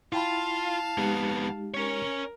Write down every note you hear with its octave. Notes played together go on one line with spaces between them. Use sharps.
E4 F4 F5 G5 A5 B5
F2 G#3 B3 D#4 G4
C#4 A#4 C#5